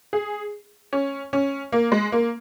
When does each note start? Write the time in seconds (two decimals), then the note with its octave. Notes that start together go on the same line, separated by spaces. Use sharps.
0.13 G#4
0.93 C#4
1.33 C#4
1.72 A#3
1.92 G#3
2.12 A#3